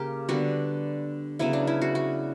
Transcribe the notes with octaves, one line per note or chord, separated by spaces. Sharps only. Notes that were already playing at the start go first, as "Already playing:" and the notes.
Already playing: C#3 A#3 G4 A#4
D3 G3 B3 F#4
C#3 F#3 B3 E4
D4
E4
F#4
F#4